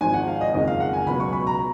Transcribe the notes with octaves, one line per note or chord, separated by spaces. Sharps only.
G#1 G#2 F3 G#5
F#5
F5
D#5
F#1 F2 D#3 G#3 D#5
F5
F#5
G#5
C#2 B2 F#3 B5
C#6
B5
A#5